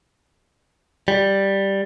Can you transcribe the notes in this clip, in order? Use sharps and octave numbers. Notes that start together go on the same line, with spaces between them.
G3